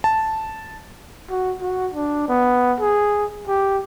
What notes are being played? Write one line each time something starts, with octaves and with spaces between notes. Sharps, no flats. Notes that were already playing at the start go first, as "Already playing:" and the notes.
A5
F#4
F#4
D4
B3
G#4
G4